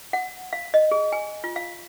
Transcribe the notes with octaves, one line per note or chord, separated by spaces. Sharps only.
F#5
F5
D#5
G#4
G#5
F4
F5